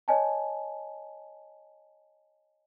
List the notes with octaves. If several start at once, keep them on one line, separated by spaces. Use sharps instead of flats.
C#5 D#5 G#5 A5